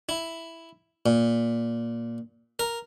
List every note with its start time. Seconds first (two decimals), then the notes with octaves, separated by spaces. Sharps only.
0.09 E4
1.06 A#2
2.59 A#4